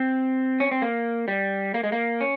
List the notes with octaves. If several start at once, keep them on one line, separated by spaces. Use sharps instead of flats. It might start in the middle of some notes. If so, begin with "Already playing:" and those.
Already playing: C4
C#4
C4
A#3
G3
A#3
G#3
A#3
C#4